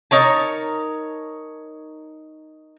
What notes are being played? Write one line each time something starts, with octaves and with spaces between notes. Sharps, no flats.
D#4 A#4 C#5 A5